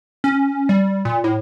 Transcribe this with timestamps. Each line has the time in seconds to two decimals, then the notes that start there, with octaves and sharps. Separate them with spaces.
0.24 C#4
0.69 G3
1.05 A#2
1.24 A2